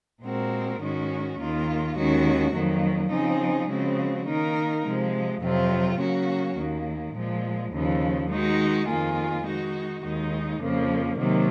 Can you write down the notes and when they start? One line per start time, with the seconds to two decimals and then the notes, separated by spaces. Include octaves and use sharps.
0.22 A#2 G#3 C4 F#4 A#4
0.80 G#2 D#3 G#3 C#4 F#4
1.38 D#2 D#3 A#3 F4
1.95 D#2 D#3 G#3 C#4 F#4
2.53 F2 D#3 F#3 A#3
3.11 C#3 F3 C4 D#4 G#4
3.68 C#3 F3 G#3 C4 F#4
4.26 D#3 A#3 D#4 A#4
4.85 C3 F3 G#3
5.41 F2 C3 F#3 C4 F4
5.99 C#3 F#3 A#3 C#4 F#4
6.57 D#2 D#3 A#3
7.15 A#2 F3 G#3
7.72 D#2 C#3 F3
8.30 D#3 G#3 D#4 F#4
8.87 F2 D#3 A#3 F4 G#4
9.45 D#3 G#3 D#4 F#4
10.03 D#2 D#3 G#3 D#4
10.61 F2 C#3 F3 A#3
11.18 C3 D#3 F#3 A#3